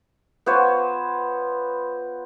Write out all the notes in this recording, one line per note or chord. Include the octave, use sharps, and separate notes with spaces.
B3 F4 C5 C#5